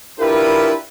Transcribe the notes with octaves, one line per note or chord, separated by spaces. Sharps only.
D4 E4 F4 G4 A#4 B4